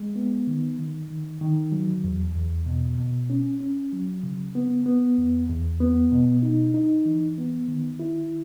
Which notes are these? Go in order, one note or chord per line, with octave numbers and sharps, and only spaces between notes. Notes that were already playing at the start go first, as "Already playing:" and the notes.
Already playing: G#3
B3
D#3
D#3
D#3
D#3
F#3
E2
E2
B2
B2
C#4
C#4
F#3
C#3
B3
B3
E2
E2
B3
B2
D#4
D#4
E3
B3
D#3
E4